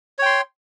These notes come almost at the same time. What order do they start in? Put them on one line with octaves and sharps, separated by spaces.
C#5 G5 C6